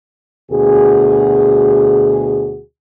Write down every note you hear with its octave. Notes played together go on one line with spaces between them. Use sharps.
D2 B2 F#4 G#4